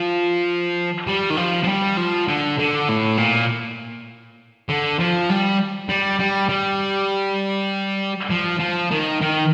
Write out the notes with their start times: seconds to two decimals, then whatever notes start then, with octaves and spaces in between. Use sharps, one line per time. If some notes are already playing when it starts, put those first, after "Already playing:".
Already playing: F3
1.07 G3
1.30 D#3
1.37 F3
1.64 F3
1.68 G3
1.97 F3
2.28 D3
2.59 D3
2.89 A2
3.18 A#2
4.69 D3
5.00 F3
5.30 G3
5.89 G3
6.19 G3
6.49 G3
8.31 F3
8.60 F3
8.91 D#3
9.21 D#3